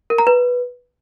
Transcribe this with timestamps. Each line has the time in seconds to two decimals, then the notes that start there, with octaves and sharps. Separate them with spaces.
0.10 A#4
0.18 A#5
0.27 B4